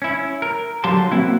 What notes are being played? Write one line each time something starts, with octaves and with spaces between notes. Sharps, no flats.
C#4 E4
A#4
D3 F#3 G4 F5 A5 C6
A#3 C4 E4 F#4